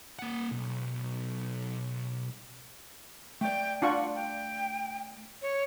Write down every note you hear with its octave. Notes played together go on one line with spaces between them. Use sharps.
A#3 F#5
B1
A3 D5 G5
D4 F4 F#5 C#6
G5
C#5